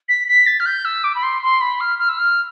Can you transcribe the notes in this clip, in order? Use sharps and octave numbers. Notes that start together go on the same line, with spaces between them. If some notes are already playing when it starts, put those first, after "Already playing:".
B6
B6
A6
F6
G6
E6
D6
B5
C6
C6
B5
F6
F6
E6
F6